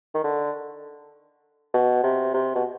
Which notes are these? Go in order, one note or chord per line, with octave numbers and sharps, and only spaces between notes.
D#3
D3
B2
C3
C3
B2